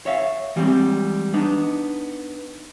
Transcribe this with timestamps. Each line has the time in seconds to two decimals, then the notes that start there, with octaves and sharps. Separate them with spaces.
0.06 C#5 E5 F5
0.56 E3 G3 G#3 A#3 C4
1.34 B3 D4 D#4